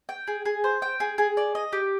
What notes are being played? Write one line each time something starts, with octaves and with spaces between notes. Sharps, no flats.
G5
G#4
G#4
C5
G5
G#4
G#4
D5
D#5
G4